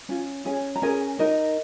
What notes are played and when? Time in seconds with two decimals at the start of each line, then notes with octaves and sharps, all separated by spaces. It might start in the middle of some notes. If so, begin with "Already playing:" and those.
0.09 C#4 F4
0.45 C#4 G#4 G#5
0.76 A#5
0.82 C#4 G#4 A#4 G#5
1.19 D#4 A#4 D#5